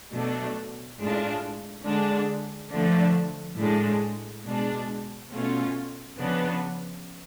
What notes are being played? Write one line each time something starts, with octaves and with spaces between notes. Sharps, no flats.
B2 F#3 A3 D4
A2 G#3 D4 F4
D3 G#3 D4
D3 F3 A3 D4
A2 G#3 D4
B2 G#3 D4
B2 A3 C#4 F4
C#3 F3 B3 D4